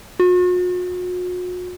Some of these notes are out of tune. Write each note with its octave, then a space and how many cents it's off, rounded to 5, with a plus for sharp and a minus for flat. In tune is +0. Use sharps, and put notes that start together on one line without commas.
F#4 -45